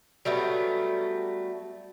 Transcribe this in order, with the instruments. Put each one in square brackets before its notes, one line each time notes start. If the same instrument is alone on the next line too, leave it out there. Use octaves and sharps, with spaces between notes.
[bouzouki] F#3 G3 A3 B3